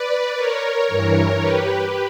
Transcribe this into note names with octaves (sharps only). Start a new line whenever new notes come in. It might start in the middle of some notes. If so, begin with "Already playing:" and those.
Already playing: B4 D5
A#4 C#5
G2 E3
G4 B4